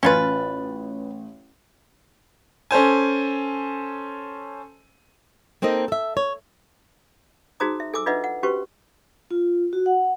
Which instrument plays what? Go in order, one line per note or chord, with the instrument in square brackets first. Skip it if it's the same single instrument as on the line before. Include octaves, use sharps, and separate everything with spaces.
[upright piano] A1 A6 [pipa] C#4 F4 B4
[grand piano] C#4 A4 C5 G#5
[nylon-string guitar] A#3 C4 D#4 A4 D#5
A4 E5
C#5
[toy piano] D#4 F#4 G#4 C5 A#5 D#6
E5
A4 G#5 D6 E6
D4 F4 B4 D#5 E5 F#5
F#5
C#4 F#4 G4 B4 C5 C#6
[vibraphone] F4
F#4
F#5